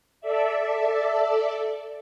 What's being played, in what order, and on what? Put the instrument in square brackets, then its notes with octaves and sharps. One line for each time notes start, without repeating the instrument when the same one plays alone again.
[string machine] A4 D5 E5